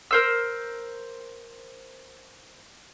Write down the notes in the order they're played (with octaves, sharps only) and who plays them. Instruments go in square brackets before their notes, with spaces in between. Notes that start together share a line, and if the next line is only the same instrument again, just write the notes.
[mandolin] A#4 C5 E6